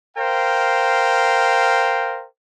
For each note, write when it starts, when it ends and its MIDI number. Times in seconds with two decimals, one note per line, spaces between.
0.17 2.25 70
0.17 2.25 72
0.17 2.25 77
0.17 2.25 79